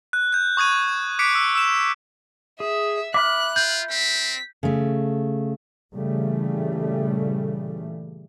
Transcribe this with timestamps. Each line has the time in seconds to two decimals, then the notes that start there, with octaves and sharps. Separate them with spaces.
0.13 F#6
0.33 F#6 G6
0.57 C#6 D#6 G#6 D#7
1.19 D6 F#6 B6 C#7 D7
1.35 E6
1.55 E6 E7
2.60 G#4 E5
3.14 E5 B5 D6 F6 F#6
3.56 F4 G6
3.91 C4 B6
4.63 C#3 A3
5.95 A#2 C#3 E3 G3 A3